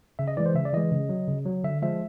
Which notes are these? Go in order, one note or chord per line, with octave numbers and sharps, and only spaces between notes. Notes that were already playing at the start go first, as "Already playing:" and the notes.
C#3 E5
D#5
E3 G#3 D5
C5
C#3 E5
D5
E3 G#3 D#5
C#3
F#3
C#3
F#3
D3 E5
F3 G#3 E5